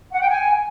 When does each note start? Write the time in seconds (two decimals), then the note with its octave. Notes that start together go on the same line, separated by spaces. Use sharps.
0.12 F#5
0.20 G5
0.28 G#5